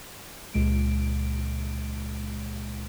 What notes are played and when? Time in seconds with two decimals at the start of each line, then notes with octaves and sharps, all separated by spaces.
0.54 C#2 A#2 G#3 D7